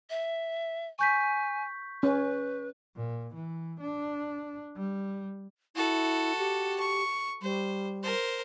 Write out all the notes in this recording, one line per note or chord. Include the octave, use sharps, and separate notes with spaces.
E5
G#5 C#6 G6 B6
C#4 B4
A#2
E3
D4
G3
E4 F#4 A4
G4
C#6
G3 C5
A#4 C5